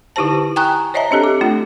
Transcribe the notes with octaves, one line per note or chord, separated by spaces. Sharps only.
D3 D#4 E4 G4 C5 A5
G5 G#5 A#5 C#6 D#6 F#6
C5 C#5 D#5 E5 A5 A#5
C4 D4 G4 A4
D6
A3 D4 F4